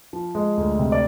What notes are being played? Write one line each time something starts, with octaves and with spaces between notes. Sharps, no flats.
F3
G#3
D2
C3
D5